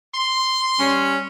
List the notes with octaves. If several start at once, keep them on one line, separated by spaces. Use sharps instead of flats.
C6
G3 C#4